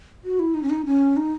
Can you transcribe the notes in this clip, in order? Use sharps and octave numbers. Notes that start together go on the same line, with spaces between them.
F#4
E4
D#4
C#4
D#4
C#4
D#4